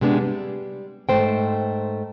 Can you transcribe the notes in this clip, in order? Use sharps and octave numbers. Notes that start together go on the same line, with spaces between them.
C3 G#3 B3 D4
G3
G#2 A3 C5 G5